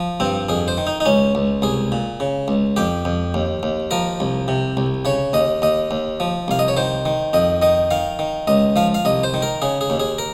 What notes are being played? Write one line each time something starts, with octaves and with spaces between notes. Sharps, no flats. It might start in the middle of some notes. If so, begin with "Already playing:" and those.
Already playing: F3
G2 C4
F2 G#4
C5
D#3
D#4
D#4
C#2 C#4
C#2
C2 G#4
A#2
C#3
C#2
F2 G4
F2
D#2
D#2
F3 A#4
C2
C3
C2
C#3 C#5
D#2 D#5
D#2 D#5
D#2
F3
C2 F5
D#5
C#5
D#3 C5
D#3
F2 D#5
D#3 D#5
D#3 F5
D#3
C#2 D#5
F3 F5
F5
C2 D#5
C5
D#3
A#4
C#3 G#4
G#4
D#2
G#4
A#4